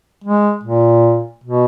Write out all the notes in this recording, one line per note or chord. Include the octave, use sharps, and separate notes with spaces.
G#3
A#2
B2